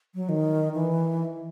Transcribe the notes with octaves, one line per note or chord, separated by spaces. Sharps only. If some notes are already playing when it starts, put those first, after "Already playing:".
F#3
D#3
E3